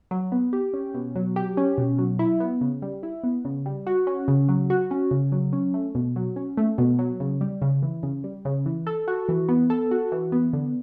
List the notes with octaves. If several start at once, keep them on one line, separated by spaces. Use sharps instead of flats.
F#3
B3
G4
C#4
B2
F#3
G4
C#4
B2
F#3
E4
B3
C#3
G3
E4
B3
C#3
G3
F#4
C#4
C#3
F#3
F#4
C#4
C#3
F#3
C#4
A3
B2
F#3
C#4
A3
B2
F#3
C#3
G3
C#3
E3
C#3
G3
C#3
E3
A4
F#4
E3
B3
A4
F#4
E3
B3
D3